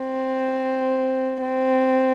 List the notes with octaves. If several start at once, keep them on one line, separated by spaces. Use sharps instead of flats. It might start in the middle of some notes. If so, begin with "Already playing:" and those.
Already playing: C4
C4